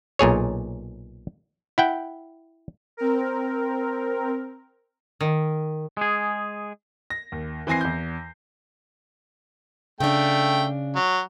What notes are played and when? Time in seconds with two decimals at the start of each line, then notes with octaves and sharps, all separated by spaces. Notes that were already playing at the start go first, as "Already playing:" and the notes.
0.19 B1 A#2 G#4 C#5
1.78 E4 F#5 G5
2.97 C4 A#4
5.21 D#3
5.97 G#3 G#4
7.10 A#6
7.32 D#2
7.67 E3 C4 G#5 A#6 C7
7.81 E2 G6
10.00 C#3 A3 D4 G5
10.96 F#3